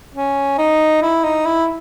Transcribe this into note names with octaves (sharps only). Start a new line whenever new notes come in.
C#4
D#4
E4
D#4
E4